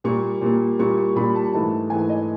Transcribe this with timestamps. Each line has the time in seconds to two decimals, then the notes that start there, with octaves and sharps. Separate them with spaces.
0.04 A#2 G3 A#3 C#6
0.41 A#2 G3 A#3
0.79 A#2 G3 A#3 C#6
0.98 C#6
1.16 A#2 G3 A#3 B5
1.35 A5
1.53 G#2 E3 A3 A5
1.90 G#2 E3 A3 G#5
2.09 D#5